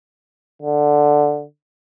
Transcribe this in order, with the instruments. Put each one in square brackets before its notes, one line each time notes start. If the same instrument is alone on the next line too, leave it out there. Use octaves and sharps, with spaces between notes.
[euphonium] D3